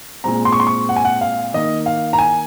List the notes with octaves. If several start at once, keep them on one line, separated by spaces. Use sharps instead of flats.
A#2 G#3 C4 A#5
C6
C#6
C6
C#6
F#5
G#5
F#5
F5
D#3 A#3 D#5
F5
A#5
G#5